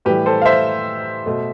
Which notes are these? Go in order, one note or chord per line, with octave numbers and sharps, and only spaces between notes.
A2 E3 G3 G4 B4
A4 C5
F5
C5 E5
B2 A3